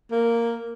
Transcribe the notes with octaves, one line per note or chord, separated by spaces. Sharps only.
A#3